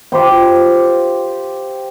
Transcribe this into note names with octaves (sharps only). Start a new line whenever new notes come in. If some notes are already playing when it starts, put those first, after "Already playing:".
F4 G4 C5 G5